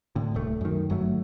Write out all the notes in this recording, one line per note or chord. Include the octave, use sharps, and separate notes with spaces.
A2 D3
D1 C2 A3
F#2 D#3
G1 F#3 A3